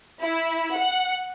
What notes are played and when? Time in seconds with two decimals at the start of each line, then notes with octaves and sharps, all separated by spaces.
0.22 E4
0.74 F#5